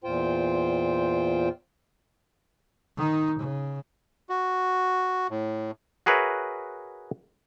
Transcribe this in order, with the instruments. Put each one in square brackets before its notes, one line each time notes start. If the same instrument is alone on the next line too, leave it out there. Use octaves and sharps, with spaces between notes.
[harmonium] E2 A#2 F4 C5 G5
[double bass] D#3 D#4
C#3
[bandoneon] F#4
A2
[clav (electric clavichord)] F#4 G#4 A#4 B4 C#5 E5